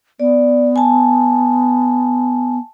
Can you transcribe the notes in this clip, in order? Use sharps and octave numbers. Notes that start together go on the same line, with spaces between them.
B3 D5
G#5 A5